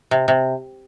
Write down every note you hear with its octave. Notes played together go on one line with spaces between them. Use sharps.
C3
C3